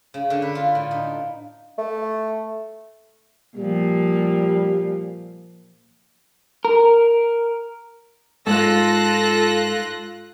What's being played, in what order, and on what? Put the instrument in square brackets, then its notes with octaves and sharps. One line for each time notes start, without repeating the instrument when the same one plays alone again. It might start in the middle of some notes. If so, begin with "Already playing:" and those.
[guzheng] C#3
D3
B4
F4
A2
D#4
[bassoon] A3
[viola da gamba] A#2 F3 [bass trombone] G3
[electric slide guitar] A#4
[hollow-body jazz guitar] G#2 [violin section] F4 F#6 A#6 [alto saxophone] A4